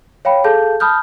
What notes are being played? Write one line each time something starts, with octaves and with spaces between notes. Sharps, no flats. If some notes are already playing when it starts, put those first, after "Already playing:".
C#5 F5 G5 B5
G#4 A4 F5 A5 G6
A5 B5 D#6 F6 G6